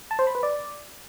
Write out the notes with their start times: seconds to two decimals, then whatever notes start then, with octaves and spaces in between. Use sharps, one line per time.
0.11 A5
0.19 C5
0.27 B5
0.35 B4
0.43 D5